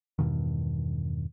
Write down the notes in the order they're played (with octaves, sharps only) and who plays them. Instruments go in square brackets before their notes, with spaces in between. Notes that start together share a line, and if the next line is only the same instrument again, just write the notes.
[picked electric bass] E2 G2 B2 D#3